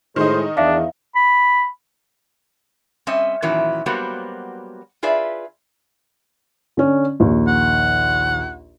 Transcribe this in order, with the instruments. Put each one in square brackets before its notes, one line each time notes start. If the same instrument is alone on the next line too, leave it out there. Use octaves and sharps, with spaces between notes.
[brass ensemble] A2 G#3 [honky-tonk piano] D#3 D#4 [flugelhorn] C5
[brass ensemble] E2 [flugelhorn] D4 [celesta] E5 F5
[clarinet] B5
[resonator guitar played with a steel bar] G3 C4 C#4 D#5 E5
A#2 D#3 E3 F#3 C#4 E4
F#3 G3 A#3 B3 F#4 C5
F4 G#4 B4 D5 E5
[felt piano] D3 C#4
A#1 D#2
[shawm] F#5